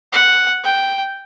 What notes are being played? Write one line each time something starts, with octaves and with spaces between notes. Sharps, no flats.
F#5
G5